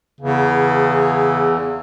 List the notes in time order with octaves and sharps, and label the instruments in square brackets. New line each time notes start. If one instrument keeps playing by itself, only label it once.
[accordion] E2 [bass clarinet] C#3